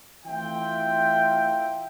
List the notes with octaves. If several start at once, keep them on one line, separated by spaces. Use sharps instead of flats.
E3 A3 C4 F4 E5 G5